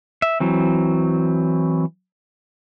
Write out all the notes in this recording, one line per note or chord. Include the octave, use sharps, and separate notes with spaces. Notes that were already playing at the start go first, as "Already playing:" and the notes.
E5
E3 F#3 C4